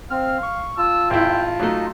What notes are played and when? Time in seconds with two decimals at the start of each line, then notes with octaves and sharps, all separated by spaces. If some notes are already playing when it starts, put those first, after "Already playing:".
0.10 C4 F5 F6
0.43 C#6
0.77 F4 A5 E6
1.10 G#1 E4 G5
1.60 F#3 A3 D#4